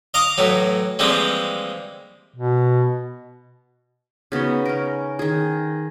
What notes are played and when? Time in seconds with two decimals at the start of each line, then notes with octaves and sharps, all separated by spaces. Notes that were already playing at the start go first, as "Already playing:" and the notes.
0.14 D#5 F5 A#5 D6 D#6
0.38 A2 E3 F#3
0.99 E3 F3 G3 G#3 A#3 C4
2.34 B2
4.32 C#3 B3 D#4 F#4
4.65 C#4 A#4
5.19 D#3 G#4